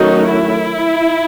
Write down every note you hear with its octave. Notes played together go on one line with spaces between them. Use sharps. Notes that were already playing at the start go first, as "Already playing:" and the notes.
Already playing: D#3 F#3 A3 C#4 D#4 F#4
E4